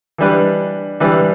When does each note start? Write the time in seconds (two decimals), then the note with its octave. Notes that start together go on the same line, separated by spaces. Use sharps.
0.18 E3 G3 D4 B4
1.00 E3 G3 D4 B4